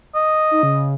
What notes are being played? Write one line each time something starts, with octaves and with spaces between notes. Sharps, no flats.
D#5
D#4
C#3